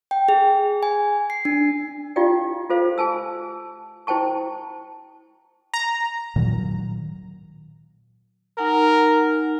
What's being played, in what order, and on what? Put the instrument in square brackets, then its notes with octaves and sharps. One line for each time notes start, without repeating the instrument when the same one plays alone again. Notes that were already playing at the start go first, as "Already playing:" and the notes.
[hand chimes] G5
G#4
G#5
C7
D4
[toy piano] E4 F4 G4 D5 F5 G5
F4 A4 C5 F5
G#4 G#5 A5 E6
E4 C5 G5 A5 C#6
[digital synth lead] A#5
[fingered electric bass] A#2 D#3 F#3
[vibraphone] D#4 F#5 G#5 [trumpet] A#4